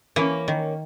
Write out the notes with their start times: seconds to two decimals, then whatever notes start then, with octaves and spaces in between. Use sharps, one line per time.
0.16 E3 A#3 C#4
0.48 D#3